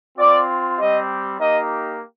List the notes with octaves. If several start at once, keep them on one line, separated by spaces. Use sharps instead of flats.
C4 F4 D5
G3 C4 G4 D#5
A#3 D#4 G4 D#5